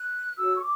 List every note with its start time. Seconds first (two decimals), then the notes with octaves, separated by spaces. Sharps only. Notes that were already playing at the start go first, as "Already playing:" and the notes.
Already playing: F#6
0.36 F#4 A4 C#5 E6
0.55 C#6
0.60 D6